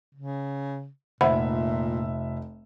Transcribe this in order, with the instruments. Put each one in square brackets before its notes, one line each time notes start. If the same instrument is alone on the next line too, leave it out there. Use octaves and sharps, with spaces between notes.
[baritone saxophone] C#3
[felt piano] F1 E5 [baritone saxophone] A#2 [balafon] C5 F#5 B5